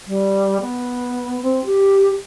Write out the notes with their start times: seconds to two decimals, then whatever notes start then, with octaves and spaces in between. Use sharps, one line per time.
0.07 G3
0.61 B3
1.42 C4
1.65 G4